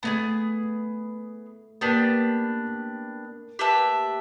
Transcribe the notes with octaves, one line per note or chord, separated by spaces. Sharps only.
A3 B3 D#4 G#4
A#3 B3 D4 G4
G4 B4 E5 A5